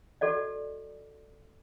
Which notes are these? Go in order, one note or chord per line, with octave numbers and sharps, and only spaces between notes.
F#4 A4 D5 D#5